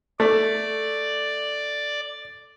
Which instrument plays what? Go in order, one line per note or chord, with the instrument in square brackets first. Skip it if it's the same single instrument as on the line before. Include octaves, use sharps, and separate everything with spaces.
[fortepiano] A3 [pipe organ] D5